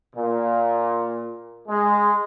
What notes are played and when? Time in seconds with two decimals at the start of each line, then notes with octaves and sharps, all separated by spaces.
0.15 A#2
1.68 G#3